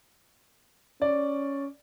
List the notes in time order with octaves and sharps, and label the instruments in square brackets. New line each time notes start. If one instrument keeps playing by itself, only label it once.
[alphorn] C#4 [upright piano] D5